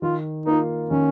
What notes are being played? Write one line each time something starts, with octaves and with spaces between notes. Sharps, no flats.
D#3 F4
A#3 D#4 F4
D#3 C#4